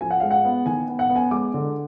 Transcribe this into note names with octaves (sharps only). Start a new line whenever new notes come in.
F3 G#5
F#5
G#3 F5
F#5
B3
D#3 G#5
B3
F#5
B3
G#5
G#3 D6
D3